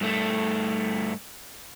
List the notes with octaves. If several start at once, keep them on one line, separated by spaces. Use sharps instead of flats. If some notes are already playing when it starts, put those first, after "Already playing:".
G2 A3